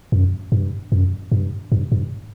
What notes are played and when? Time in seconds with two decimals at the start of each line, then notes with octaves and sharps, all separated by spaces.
0.12 F#2
0.52 G2
0.92 F#2
1.32 G2
1.72 G2
1.92 G2